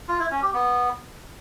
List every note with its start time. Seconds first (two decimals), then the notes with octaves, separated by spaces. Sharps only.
0.08 F4
0.20 E4
0.31 C#4
0.42 G4
0.54 B3